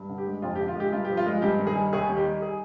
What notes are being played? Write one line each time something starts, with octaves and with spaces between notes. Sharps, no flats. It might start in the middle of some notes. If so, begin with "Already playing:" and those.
Already playing: G2
D3
G4
G#3
F2 F4
G4
D3
F4
G#3 G4
G2 F4
F3 G4
F4
G#3
G2 G4
D#3
G#4
G3
D#2 G#4
D#3
G4
G3
G#4